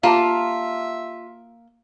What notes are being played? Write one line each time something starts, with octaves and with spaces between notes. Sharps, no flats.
A#3 F4 G4 E5 A5